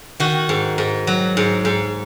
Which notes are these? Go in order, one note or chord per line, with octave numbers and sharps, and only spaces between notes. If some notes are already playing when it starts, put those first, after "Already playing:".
D#3 F#4
G#2
G#2
F#3
G#2
G#2